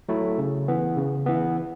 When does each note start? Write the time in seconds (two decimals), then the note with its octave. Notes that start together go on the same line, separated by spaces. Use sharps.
0.09 F#3 A3 E4
0.38 C#3
0.68 E3 B3
0.97 C#3
1.26 E3 B3